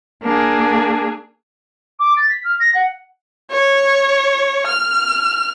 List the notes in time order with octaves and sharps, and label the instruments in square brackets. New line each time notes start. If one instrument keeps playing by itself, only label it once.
[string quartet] A#3 D4 G#4
[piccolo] D6
A6
B6
F6
A#6
F#5
[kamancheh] C#5
F6